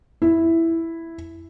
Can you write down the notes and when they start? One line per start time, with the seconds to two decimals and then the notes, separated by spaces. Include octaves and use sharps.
0.22 E4